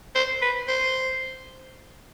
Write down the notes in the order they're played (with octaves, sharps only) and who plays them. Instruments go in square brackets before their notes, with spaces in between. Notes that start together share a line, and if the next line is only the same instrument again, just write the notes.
[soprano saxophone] C5
B4
C5